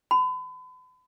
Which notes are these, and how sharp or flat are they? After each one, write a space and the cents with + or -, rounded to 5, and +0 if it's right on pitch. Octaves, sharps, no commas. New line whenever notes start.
B5 +40